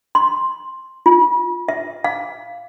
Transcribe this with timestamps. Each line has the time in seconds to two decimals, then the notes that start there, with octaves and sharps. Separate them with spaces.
0.15 C6
1.06 F4
1.68 E5
2.04 F5